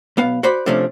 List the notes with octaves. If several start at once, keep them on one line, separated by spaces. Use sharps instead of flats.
B1 B3 F5
F#4 C5 D5 B5
C3 F3 A3 C#4 D4